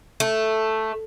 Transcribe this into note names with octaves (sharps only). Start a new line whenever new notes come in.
A3